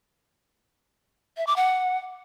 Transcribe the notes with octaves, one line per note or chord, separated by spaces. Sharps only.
E5
D6
F#5